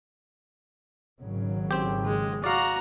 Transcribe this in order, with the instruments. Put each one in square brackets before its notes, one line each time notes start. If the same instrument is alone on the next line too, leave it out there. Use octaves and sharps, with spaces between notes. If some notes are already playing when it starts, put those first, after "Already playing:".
[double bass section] G#1 C#3 F#3
[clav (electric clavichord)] C4 G4
[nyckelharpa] G#3
[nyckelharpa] F#4 A#5 [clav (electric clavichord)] D5 F5